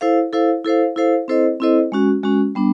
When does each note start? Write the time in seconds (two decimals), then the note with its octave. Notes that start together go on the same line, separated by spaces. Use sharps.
0.01 E4 A4 C5 F5
0.33 E4 A4 C5 F5
0.64 E4 A4 C5 F5
0.96 E4 A4 C5 F5
1.28 C4 E4 A4 C5 D#5
1.60 C4 E4 A4 C5 D#5
1.92 G#3 C#4 F#4
2.23 G#3 C#4 F#4
2.55 G3 B3 D4